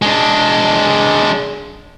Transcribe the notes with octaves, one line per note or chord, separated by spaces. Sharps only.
G#3 D4